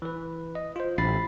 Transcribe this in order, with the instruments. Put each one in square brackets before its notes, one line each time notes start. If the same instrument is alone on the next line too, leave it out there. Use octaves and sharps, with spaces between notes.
[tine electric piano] E3 B4
D#5
F4 C5
[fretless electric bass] A1 [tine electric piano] B5 A6 C7